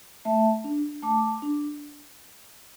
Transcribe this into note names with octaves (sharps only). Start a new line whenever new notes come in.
A3 E5 A5
D4
A3 A5 D6
D4